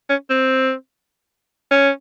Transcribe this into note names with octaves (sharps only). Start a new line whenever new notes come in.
C#4
C4
C#4